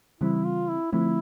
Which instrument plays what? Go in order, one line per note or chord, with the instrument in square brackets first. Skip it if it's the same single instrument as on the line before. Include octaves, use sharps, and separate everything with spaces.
[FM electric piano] C#3 E3 G3 C4 [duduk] E4
[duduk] F4
E4
[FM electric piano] D3 F3 A3 C4 [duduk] E4